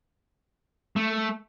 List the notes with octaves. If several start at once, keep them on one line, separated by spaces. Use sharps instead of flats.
A3